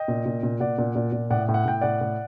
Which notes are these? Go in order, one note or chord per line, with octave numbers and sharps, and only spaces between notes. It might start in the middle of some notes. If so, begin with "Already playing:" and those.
Already playing: D#5 G5
A#2
A#2
A#2
A#2 D5 F#5
A#2
A#2
A#2
A2 D5 F#5
A2
F#5
A2 G5
A2 D5 F#5
A2